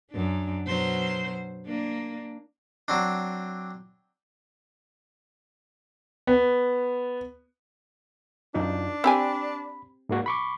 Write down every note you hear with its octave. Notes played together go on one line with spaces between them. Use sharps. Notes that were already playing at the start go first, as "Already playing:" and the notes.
F#2 D4
B2 F#3 C5
A#3 D4
F#3 C4 D4
B3
F#2 D4 D#4 F4
C4 G4 G#5 B5
G#2 A#3 F#4
B5 C#6 D6